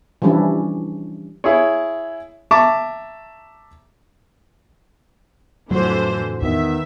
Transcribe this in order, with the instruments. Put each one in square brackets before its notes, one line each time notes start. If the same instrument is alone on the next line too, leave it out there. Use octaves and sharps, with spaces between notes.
[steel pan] E3 F3 G3 C#4 D4 E4
[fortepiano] E4 G#4 C#5
E5 A5 A#5 C#6 D6
[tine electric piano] F2 A2 F#4 [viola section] D3 E3 C5 [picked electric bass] F#3
[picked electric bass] E2 [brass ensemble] D#3 B3 [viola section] E5